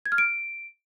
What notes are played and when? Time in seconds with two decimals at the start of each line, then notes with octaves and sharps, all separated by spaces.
0.06 G#6
0.12 F6
0.18 D7